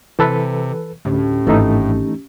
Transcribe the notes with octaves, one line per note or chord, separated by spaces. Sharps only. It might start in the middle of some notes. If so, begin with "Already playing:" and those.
C3 E3 A4 B4
D2 A2 C#4 G4
G#1 E3 A3 D#4